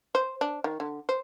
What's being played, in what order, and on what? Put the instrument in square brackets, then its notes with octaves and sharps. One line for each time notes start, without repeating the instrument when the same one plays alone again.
[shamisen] C5
D4
D#3
D3
C5